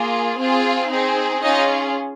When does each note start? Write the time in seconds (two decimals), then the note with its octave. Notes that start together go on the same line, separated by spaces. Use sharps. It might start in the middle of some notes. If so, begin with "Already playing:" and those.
Already playing: A#3 F4 G#4
0.36 C4 F4 G#4
0.89 C4 D#4 G#4
1.42 C#4 D#4 F4 G#4 D#5